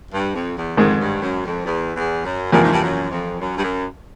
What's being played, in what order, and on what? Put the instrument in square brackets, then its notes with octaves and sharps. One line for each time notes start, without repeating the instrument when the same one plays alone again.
[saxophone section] G2
F2
E2
[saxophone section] F2 [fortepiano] G#2 D#3 G#3
[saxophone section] G2
F#2
F2
E2
E2
F#2
[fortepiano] E2 C3 F3 A#3 [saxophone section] G2
[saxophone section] G#2
G2
F#2
F2
F#2
G2
F#2